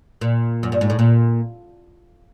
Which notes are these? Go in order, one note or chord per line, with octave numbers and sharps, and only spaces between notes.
A#2
F#2
G2
G#2
A2
A#2